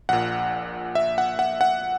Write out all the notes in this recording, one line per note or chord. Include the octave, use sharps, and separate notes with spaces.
A#1 A#2 F#5
E5
F#5
F#5
F#5